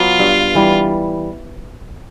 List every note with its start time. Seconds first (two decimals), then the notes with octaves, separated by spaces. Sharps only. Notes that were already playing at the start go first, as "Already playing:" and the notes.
Already playing: F#3 B3 F4
0.19 G2
0.55 E3 G3